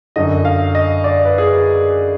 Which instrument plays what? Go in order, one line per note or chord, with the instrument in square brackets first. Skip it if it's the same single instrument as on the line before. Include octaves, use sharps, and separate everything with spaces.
[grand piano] F#2 D3 D#5
F5
D#5
D5
B4
G#4